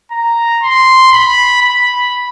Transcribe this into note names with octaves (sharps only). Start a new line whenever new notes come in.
A#5
C6
B5
B5